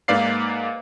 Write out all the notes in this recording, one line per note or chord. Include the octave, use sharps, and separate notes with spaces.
G#2 A#3 B4 D5 F5 C7